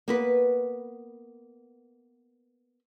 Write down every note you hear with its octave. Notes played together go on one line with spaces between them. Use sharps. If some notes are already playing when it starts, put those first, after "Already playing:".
A#3 B3 B4